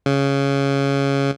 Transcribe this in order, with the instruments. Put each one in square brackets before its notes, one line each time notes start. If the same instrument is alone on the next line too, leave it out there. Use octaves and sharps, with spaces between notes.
[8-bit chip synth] C#3